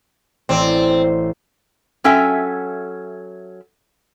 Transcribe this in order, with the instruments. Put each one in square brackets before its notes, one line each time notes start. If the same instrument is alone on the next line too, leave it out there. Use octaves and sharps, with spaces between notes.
[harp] A1 D5 [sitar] C4
[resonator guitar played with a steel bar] F#3 C#4 A4 E5 G5 G#5